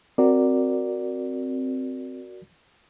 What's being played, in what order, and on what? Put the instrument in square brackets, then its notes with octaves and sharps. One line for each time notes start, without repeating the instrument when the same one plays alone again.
[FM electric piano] C4 [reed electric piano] F#4 A#4 D5